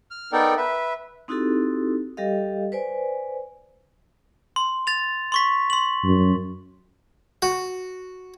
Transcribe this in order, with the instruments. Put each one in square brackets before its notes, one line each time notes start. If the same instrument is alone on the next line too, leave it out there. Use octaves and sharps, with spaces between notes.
[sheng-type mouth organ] F6
B3 D#4 A4 A#4 D5 G5
B4 E5
[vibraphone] C4 D#4 E4 F#4 G4 A4
G3 G4 A4 D#5 F5
B4 C5 D5 G#5
[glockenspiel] C6
A6 F7
C6 C#6 B6
C6 F#7
[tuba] F#2
[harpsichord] F#4